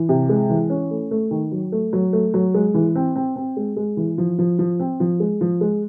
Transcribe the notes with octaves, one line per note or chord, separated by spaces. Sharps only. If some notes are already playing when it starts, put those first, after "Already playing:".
Already playing: E3
C3
G#3
E3
C#4
A3
A3
D#3
F#3
A3
F#3
A3
F#3
G#3
E3
C4
C4
C4
G#3
G#3
E3
F3
F3
F3
C4
F3
G#3
F3
G#3